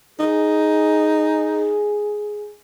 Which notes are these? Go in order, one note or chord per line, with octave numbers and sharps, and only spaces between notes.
D#4 G#4